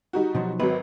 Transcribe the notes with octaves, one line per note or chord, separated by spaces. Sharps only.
G3 D#4 F#4
B2 F3 F#3
G#1 F#3 B4